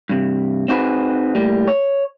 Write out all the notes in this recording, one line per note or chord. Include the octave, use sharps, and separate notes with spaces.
G2 C3
C4 D#4 F#4 G#4 B4
A2 G3 A#3
C#5